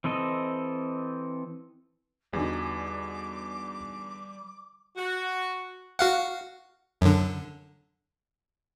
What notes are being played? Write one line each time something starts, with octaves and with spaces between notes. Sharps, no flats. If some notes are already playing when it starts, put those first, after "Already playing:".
E3 C4 A4 D#5
E2 D3 G3 D#4 F#4 G#5 D6
F#4
F#4 F5 F#5
F#2 D3